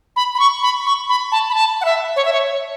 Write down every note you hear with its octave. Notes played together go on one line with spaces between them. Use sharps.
B5
B5
C#6
B5
C#6
B5
A5
B5
A5
F#5
E5
C#5
E5
C#5